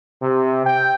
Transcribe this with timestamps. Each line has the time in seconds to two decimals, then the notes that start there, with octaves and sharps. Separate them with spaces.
0.22 C3
0.65 G5